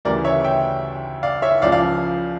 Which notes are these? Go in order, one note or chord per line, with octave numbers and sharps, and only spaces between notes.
D2 C#3 E3 G3 A#4 D5
C#5 E5
E5 G5
D5 F5
C#5 E5
C#2 C#3 F3 D5 F5
D5 F5